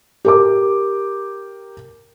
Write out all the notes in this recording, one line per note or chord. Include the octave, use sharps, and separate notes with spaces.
G4 A#4 D6